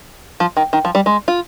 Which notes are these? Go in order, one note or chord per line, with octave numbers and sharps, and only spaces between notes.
F3
D#3
D#3
F3
G3
G#3
F4